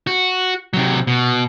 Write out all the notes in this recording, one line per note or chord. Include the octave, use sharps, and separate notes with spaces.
F#4
C3 F#3
B2